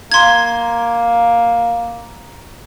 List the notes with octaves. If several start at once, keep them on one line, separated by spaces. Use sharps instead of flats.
A#3 C6 G#6